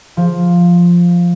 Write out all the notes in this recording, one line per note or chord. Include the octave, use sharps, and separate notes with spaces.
F3